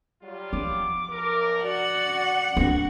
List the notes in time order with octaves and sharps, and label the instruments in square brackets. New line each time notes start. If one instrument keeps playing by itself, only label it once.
[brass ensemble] F#3 G3 F4
[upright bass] F3 [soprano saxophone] D6
[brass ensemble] B1 A#4
[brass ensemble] F#4 [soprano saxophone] D5 [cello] F#5
[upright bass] C4 D4 [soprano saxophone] F#4